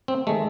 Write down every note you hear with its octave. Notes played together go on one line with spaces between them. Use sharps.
C4
D#3 G#3 A3